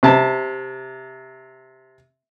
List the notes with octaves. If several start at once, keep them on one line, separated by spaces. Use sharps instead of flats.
C3 A5